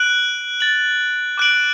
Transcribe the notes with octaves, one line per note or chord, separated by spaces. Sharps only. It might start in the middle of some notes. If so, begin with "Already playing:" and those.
Already playing: F#6 D7 F#7
A6 F#7
D6 F#6 D7 F#7